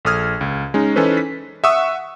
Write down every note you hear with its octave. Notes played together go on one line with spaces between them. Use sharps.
A#1 A4 D#6 F6 G#6
C#2
G#3 C#4 D#4
E3 C#4 D#4 A4 B4 C5
B6
E5 F#5 C#6 D#6 E6